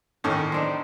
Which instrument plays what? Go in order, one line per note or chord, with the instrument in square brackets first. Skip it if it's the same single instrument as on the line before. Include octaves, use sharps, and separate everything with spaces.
[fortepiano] E2 A2 C#4 [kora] D#3
[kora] C4 D4 D#4